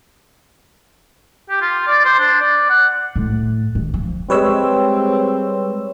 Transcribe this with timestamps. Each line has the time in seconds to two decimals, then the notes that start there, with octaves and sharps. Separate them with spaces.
1.50 G4
1.61 F4
1.87 D5
2.05 C5
2.19 D4
2.40 D5
2.70 F#5
3.16 A2
3.75 D#3
3.94 F3
4.30 G3 G#3 C4 B4 C#5 E6